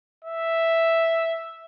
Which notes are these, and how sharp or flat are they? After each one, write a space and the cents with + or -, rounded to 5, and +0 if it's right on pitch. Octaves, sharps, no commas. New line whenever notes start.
E5 +0